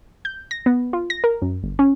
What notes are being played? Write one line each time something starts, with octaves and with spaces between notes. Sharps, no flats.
G6
A#6
B3
F4
A#6
A#4
F#2
G1
C#4